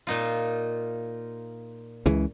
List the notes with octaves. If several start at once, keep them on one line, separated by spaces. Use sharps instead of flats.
A#2 D#4 F4
C#2 C#3 E3